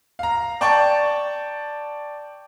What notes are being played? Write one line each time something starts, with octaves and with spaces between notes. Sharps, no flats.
F5 A#5
D5 G5 A5 C#6